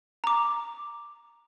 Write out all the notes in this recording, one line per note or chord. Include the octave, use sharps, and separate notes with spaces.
A#5 D6